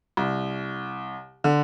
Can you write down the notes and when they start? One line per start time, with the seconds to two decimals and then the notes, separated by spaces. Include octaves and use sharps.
0.17 C2
1.44 D3